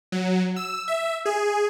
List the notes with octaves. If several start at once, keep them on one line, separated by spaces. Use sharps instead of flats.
F#3
E6
E5
G#4